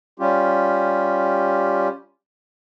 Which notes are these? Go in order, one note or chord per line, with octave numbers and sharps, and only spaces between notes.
G3 C#4 F4 G4